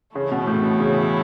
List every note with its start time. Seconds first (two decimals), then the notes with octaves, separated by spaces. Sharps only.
0.15 C#3 E3 A3 E4
0.32 B2
0.47 A2
0.63 B2
0.79 C#3